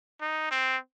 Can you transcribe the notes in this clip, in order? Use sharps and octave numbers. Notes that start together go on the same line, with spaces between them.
D#4
C4